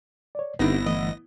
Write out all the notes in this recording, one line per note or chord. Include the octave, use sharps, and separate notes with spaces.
C#5 D5
G1 D3 B3 C4 D#4 E4 G4 A#6
E3 A3 D#5